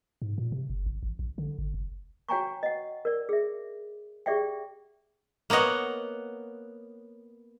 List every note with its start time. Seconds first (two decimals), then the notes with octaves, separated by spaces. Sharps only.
0.22 G#2
0.38 A#2
0.52 C3
0.70 F#1
0.86 G#1
1.03 A1
1.19 A#1
1.38 D3
1.58 G#1
1.74 F1
2.29 F#4 C#5 G5 G#5 A#5 C#6
2.63 D#5 F#5
3.05 A#4 D5
3.29 G#4 E5
4.26 G4 G#4 D5 E5 F#5 G5
5.50 A#3 B3 C#5 D#5 F#5